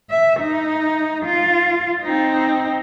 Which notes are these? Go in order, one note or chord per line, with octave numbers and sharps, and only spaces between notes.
E5
D#4
F4
C4 D#4